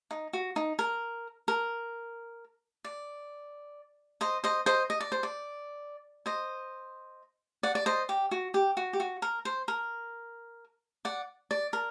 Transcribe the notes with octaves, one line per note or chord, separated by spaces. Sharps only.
D#4
F#4
D#4
A#4
A#4
D5
C5 D#5
C5 D#5
C5 D#5
D#5
D5
C5
D5
C5 D#5
D5 F#5
D5
C5 D#5
G4
F#4
G4
F#4
G4
F#4
A#4
C5
A#4
D5 F#5
D5
A#4